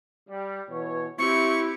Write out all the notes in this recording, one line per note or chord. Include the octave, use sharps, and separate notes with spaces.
G3
B2 E3 C#5
C4 E4 G4 C#6